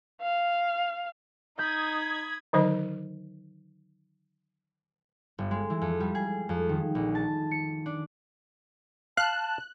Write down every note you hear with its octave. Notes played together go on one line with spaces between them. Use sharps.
F5
D#4 B5 D#6 G6 G#6
D3 D#3 F#3 D#4 C5 D#5
G1
G#3
E3
F2
G3
G#4
F2
D#3
A#1
A5
C#7
D4
F5 A5 F#6